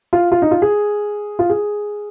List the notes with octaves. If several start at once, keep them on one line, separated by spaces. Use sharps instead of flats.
F4
F4
D#4
F4
G#4
F4
G#4